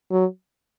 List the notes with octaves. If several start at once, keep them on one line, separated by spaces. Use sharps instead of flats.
F#3